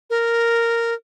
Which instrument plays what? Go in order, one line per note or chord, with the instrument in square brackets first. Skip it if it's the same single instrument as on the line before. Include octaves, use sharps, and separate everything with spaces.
[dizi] A#4